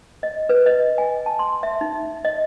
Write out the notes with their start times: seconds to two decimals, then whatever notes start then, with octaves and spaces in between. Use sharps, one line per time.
0.23 D#5
0.49 B4
0.66 D#5
0.98 G#5
1.26 A5
1.39 C6
1.63 E5
1.81 D#4
2.25 D#5